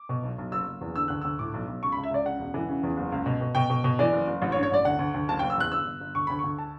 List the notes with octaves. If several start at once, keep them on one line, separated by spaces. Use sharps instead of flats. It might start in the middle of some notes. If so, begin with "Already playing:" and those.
Already playing: D6
B2
B1
B1
F#1 E6
F#1
E2
D3 E6
D2 F#6
D2 E6
A2 D6
B1
B1
C#2 C#6
B5
C#2
E5
C#2 D5
C#3 F#5
E1
E3
C#3
E2
F#1
C#2
B2
B2
B2 G5
B2
B2
E3 D5
F#1
F#1
A1
C#5
G2
C#5
A1 D5
D2 F#5
D2
D2
F#1 A5
G5
F#1
E6
E2 F#6
G1 E6
G1
G1
D2 C#6
D2 B5
D2 C#6
A5